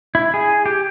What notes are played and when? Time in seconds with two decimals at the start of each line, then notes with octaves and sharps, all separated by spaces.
0.15 E4
0.34 G#4
0.66 G4